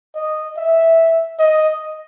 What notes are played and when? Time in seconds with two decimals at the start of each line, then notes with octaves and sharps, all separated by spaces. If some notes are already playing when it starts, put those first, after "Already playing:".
0.15 D#5
0.57 E5
1.39 D#5